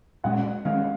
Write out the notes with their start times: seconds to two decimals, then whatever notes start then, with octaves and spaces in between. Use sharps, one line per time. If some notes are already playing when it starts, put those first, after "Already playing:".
0.24 A#2 G#3 C#4 F#5
0.65 D#3 G#3 C#4 F5